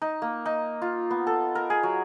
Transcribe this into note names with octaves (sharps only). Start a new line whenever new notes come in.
D#4
A#3
D#4
F4
B3
A4
A#4
G#4
F#3